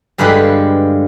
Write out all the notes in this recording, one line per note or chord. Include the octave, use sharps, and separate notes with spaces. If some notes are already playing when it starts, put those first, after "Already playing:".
G2 D3 G#3 F4 G4 B4